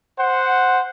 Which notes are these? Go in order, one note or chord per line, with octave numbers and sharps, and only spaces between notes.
C5 F#5